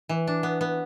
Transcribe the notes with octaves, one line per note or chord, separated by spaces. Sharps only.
E3
D4
B3
B3